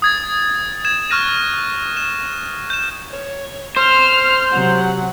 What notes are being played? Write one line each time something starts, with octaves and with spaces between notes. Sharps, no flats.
D#6 G#6 A6
G#6 E7
C#6 F6 F#6 A#6 D#7 E7
E7
G6 E7
C#5
C5 F6
C3 F#3 F#5